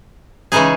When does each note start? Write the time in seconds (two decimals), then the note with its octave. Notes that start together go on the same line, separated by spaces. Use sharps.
0.52 C#3 E3 G#3 D#4 G#4